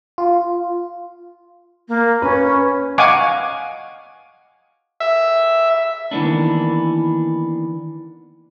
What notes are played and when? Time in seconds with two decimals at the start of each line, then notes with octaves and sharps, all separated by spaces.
0.18 F4
1.88 A#3
2.22 C#4 B4
2.98 D#5 F5 F#5 G#5 C#6 D6
5.00 E5
6.11 D#3 E3 G#3 A#3 B3 D4